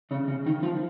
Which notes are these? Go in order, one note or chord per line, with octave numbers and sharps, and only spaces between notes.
C#3 C#4
C#3 C#4
D#3 D#4
F3 F4